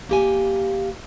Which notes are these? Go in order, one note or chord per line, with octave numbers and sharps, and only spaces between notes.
A#3 G4 G#5